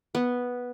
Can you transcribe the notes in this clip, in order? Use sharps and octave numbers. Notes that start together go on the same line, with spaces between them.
B3